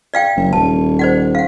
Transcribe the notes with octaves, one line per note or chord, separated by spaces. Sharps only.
D5 F5 G5
F#1
D#1 A5
C5 D5 F#5
F5 F#5